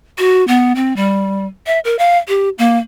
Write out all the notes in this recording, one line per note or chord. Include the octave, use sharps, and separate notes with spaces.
F#4
B3
C4
G3
E5
A#4
F5
G4
A#3